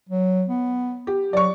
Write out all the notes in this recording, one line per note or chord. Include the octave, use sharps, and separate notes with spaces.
F#3
B3
G4
F#3 D5 C#6